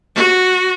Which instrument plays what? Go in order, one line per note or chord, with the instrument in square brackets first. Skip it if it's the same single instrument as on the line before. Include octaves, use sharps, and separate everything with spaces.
[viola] F#4